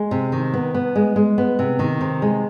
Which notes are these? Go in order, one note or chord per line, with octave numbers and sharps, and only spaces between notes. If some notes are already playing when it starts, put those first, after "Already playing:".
Already playing: G#3
C3
D#3
B3
B3
G#3
G#3
B3
C3
D#3
C3
G#3